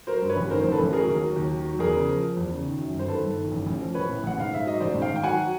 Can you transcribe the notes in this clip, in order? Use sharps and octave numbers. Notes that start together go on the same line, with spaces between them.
F#3 A#4 C5
G2
B4 C#5
A1
D#3 A#4 C5
A1 C5
A4 B4
A1
F#3 G#4 A#4
D#2
F#3
D#2
D#3
F#3
E2 G#4 A#4
C#3
F3
F3
E2
C#3
D#3
F#2
G1
C5
D#3 A4 B4
G1
D#3
A1
A1
F3
A1 B4 C#5
A2
A1 F#5
G#2 F5
G#2 E5
F#3 D#5
A1 C5 D5
G#2
F5 G5
D#3
G5
F#3 F#5 G#5
F#3